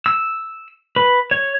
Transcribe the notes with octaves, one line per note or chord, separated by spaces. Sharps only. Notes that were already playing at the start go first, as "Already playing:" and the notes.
E6
B4
C#5